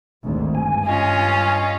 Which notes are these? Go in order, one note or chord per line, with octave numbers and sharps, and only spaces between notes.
G#1 D2
G2 G#5
C#4 F4 D#5